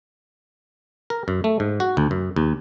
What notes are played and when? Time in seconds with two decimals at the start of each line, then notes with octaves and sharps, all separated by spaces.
1.10 A#4
1.28 F#2
1.44 A3
1.60 G#2
1.80 F#4
1.97 D2
2.11 F#2
2.36 D#2